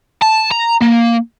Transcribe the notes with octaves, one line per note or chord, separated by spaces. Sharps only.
A5
A#5
A#3